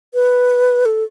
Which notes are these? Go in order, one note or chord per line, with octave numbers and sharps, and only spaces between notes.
B4
A4